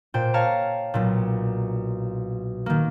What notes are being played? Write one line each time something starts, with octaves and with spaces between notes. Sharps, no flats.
A#2 C5 G5
C#5 F5 A5 A#5
B1 A#2
D#3 A#3